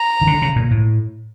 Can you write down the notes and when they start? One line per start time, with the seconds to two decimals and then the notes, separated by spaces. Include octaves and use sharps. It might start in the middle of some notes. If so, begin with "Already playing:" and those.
Already playing: A#5
0.21 D#3
0.27 D3
0.42 C#3
0.56 A#2
0.71 A2